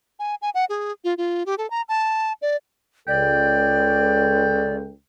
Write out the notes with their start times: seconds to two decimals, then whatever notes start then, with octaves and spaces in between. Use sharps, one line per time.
0.19 G#5
0.42 G#5
0.54 F#5
0.69 G#4
1.04 F4
1.18 F4
1.46 G4
1.58 A4
1.70 A#5
1.89 A5
2.42 D5
3.08 C#2 A4 D5 G5